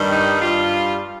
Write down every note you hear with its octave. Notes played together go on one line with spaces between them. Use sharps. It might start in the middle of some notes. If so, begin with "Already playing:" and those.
Already playing: G2 D#3 G3
D#4
G2 G3 F4